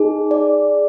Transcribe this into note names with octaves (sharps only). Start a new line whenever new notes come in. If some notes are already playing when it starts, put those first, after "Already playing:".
Already playing: D#4 G#4
D5